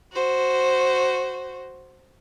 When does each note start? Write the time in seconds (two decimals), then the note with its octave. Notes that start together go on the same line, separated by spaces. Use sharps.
0.13 F#4 C5